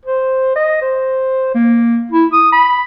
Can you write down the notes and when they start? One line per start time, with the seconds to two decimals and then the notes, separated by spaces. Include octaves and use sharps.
0.05 C5
0.56 D#5
0.82 C5
1.55 A#3
2.12 E4
2.33 D#6
2.52 B5